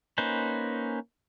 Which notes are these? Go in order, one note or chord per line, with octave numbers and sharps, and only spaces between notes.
A#3 C#4 D#4 B4 C5